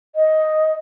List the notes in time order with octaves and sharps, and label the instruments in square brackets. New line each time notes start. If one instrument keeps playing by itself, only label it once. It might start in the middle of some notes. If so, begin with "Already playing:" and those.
[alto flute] D#5